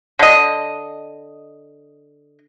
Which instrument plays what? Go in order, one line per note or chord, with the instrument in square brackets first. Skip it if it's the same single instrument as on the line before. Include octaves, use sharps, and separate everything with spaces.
[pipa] D3 D#5